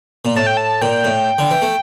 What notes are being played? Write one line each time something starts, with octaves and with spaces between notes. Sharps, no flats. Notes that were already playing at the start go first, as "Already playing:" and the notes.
A#2
A2 A5
G5
A5
A#2 G5
A2
D3
E3
A3